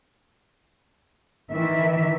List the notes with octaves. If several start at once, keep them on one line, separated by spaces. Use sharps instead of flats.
D#3 E3 E5